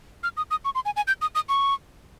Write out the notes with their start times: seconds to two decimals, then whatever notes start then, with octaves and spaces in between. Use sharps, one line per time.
0.23 F6
0.37 D#6
0.51 D#6
0.65 C#6
0.75 C6
0.85 G#5
0.96 G#5
1.07 G6
1.21 D#6
1.35 D#6
1.49 C#6